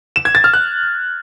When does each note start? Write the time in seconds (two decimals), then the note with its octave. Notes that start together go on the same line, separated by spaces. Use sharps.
0.16 E7
0.25 G#6
0.35 A6
0.44 F6
0.53 F#6